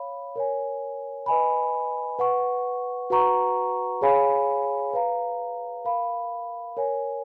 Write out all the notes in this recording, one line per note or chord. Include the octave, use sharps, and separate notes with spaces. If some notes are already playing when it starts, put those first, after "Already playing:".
Already playing: C#5 F5 B5
A#4 C#5 G#5
B4 D#5 G#5 B5
B4 F#5 C#6
F#4 B4 F#5 A#5 C#6
G#4 C#5 F5 G#5 B5
B4 F5 A#5
A#4 F5 B5
A#4 C#5 G#5